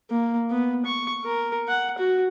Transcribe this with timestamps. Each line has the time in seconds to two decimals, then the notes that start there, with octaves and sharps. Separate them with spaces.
0.11 A#3
0.50 B3
0.85 C#6
1.24 A#4
1.68 F#5
1.98 F#4